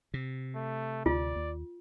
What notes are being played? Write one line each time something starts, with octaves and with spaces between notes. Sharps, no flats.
C3
A3
D2 F4 D5
D#2